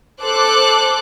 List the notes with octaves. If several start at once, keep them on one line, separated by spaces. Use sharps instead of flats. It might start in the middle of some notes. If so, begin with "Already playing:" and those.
A4 C5 D6 F#6